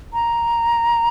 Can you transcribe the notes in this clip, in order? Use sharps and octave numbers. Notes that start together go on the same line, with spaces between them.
A#5